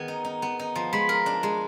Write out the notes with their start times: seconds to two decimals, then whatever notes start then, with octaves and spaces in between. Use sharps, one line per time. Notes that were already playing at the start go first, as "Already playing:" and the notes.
Already playing: D#3 G#3 B3 G#4
0.08 D#4
0.25 D#4
0.42 B3
0.59 D#4
0.75 F3
0.93 G#3 B5
1.09 A#4
1.26 D4
1.43 G#3